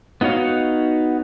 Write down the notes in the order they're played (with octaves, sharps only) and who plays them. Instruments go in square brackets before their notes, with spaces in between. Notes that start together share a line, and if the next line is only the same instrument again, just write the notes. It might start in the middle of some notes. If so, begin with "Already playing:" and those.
[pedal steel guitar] B3 D#4 F#4 C#5 F5